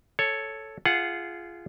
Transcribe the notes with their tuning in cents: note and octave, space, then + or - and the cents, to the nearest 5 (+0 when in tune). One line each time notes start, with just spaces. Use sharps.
A4 +0 C#5 +0
F4 -20 G#4 +5 F#5 +0